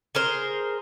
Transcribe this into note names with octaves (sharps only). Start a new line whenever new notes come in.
G#4 A#4 C5